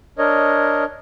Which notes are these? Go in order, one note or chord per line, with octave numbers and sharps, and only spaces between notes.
D4 A#4 C#5 D#5